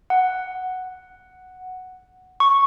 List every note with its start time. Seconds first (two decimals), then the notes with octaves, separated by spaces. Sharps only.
0.10 F#5
2.40 C#6